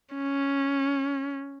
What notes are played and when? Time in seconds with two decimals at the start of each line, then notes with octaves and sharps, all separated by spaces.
0.15 C#4